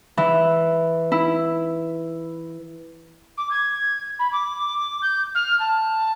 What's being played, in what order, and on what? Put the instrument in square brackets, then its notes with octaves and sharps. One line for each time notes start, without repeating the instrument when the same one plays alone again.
[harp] E3
E4
[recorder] D6
G#6
B5
D6
G6
F6
A5